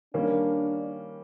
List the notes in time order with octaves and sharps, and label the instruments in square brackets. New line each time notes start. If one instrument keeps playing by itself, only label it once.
[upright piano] D#3 G3 A#3 C#4 [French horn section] D4